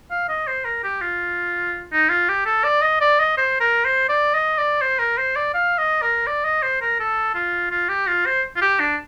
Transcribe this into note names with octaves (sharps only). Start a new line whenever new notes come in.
F5
D#5
C5
A#4
G4
F4
D#4
F4
G4
A4
D5
D#5
D5
D#5
C5
A#4
C5
D5
D#5
D5
C5
A#4
C5
D5
F5
D#5
A#4
D5
D#5
C5
A#4
A4
F4
F4
G4
F4
C5
F4
G4
D4